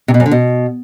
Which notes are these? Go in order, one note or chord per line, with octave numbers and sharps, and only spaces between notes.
C3
B2
F#2
D3
B2